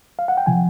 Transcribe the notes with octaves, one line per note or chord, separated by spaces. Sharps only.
F5
F#5
G5
C3 F3 G#5